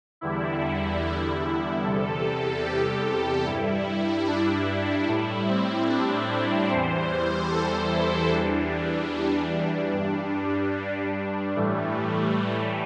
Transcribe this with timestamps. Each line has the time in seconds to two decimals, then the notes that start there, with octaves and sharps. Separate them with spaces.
0.21 E2 D3 G3 E4
1.83 E2 C3 G3 A4
2.65 G4
3.46 G2 G3 E4
4.27 D4
5.07 A2 G3 E4
5.48 C4
5.89 D4
6.70 E2 E3 G3 C5
7.50 A4
7.92 E4
8.32 E2 E3 G3 D4
9.93 G2 G3
11.55 A2 E3 G3 A3